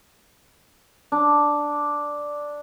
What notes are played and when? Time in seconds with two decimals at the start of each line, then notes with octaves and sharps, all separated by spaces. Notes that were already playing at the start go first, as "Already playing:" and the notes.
1.12 D4